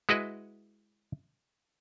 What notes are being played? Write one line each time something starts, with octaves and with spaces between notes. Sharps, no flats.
G#3 E4 F#4 B4 D#5